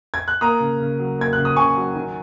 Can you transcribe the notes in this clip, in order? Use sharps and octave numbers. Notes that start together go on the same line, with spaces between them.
G#6
F#6
A#3 A#5 D#6
C#3
C#3
F#3
A#3 G#6
C#3 F#6
D#6
C#3 G#5 C#6
F#3
D#3